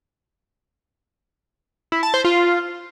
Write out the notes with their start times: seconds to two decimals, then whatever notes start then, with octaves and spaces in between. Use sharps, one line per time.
1.92 E4
2.03 A5
2.14 C5
2.25 F4